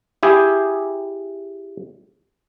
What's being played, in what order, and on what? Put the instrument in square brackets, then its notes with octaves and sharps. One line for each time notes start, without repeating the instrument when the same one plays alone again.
[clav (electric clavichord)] E4 G4 G#4